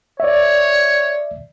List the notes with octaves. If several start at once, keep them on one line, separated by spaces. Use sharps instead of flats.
C#5 D5 E5